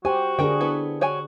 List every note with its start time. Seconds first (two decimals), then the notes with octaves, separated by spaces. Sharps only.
0.05 F#4 G4 C5 G#5
0.39 D3 D4 G#4 A#4 G5
0.61 B3 E4 A4
1.01 F#4 C#5 G5 G#5